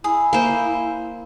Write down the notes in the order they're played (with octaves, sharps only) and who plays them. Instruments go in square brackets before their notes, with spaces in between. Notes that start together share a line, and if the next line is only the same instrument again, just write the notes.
[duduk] E4 [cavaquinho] G#4
[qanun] A#3 C5